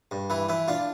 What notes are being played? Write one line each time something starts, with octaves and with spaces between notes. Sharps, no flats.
G2
E3 E4
E3 E4
D4 F4